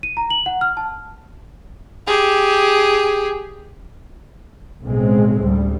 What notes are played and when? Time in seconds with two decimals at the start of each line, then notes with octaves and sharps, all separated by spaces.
0.03 D#7
0.17 A#5
0.30 F#7
0.46 F#5
0.61 F6
0.77 A5
2.07 G4 G#4
4.83 B1 A2 C#3 G#3 C4
5.45 D2 G3